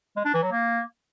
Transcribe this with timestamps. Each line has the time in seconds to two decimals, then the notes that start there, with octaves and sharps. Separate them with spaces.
0.16 G#3
0.25 D4
0.34 E3
0.43 F#3
0.52 A#3